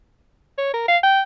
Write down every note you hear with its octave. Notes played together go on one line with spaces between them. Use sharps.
C#5
A#4
F5
G5